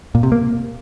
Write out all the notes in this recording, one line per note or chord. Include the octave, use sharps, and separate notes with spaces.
A#2
C3
A#3